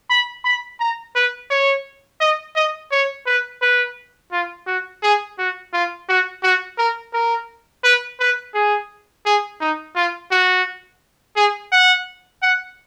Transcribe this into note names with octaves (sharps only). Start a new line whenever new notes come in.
B5
B5
A#5
B4
C#5
D#5
D#5
C#5
B4
B4
F4
F#4
G#4
F#4
F4
F#4
F#4
A#4
A#4
B4
B4
G#4
G#4
D#4
F4
F#4
G#4
F#5
F#5